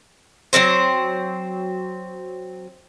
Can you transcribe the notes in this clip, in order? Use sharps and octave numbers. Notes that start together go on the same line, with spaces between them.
F#3 A#3 C4 C5